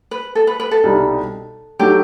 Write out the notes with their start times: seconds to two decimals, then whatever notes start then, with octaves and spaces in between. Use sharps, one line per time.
0.11 B4
0.35 A4
0.47 B4
0.60 B4
0.71 A4
0.83 C2 B2 G3 D#4
1.79 F#3 A3 D#4 G4